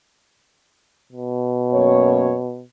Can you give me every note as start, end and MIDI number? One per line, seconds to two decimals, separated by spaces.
1.12 2.63 47
1.73 2.33 42
1.73 2.33 58
1.73 2.33 73